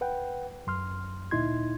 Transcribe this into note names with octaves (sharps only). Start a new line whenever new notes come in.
B4 F#5 G5
F#2 C6 F6
D2 A#2 D#4 E4 C6 G#6